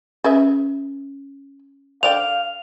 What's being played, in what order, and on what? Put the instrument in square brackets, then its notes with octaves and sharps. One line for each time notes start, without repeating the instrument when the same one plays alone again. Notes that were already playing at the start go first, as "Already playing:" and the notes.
[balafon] C#4 [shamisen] G#4 B4 E5
[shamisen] D3 D5 G5 [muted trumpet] F5 [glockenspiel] F7